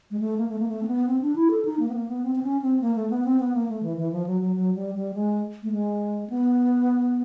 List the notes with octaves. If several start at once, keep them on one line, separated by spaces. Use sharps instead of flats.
G#3
A3
A#3
A3
A#3
A3
C4
B3
C4
D4
E4
A4
D#4
A#3
B3
A#3
B3
C4
C4
C#4
C4
A#3
A3
B3
C4
B3
A#3
A3
E3
E3
F3
F#3
F#3
F#3
G3
G3
G#3
A3
G#3
B3